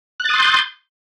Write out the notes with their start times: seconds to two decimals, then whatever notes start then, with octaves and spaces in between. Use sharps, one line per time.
0.20 F#6
0.24 A6
0.29 D#6
0.34 C6
0.38 G6